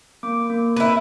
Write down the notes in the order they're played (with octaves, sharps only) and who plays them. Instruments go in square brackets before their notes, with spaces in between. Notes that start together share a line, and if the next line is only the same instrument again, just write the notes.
[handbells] A#3 D6
A#3
[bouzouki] E4 B4